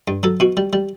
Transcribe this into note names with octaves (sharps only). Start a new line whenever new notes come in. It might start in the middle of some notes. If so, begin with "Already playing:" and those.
G2
F#3 A4
B2 F#4
G3
G3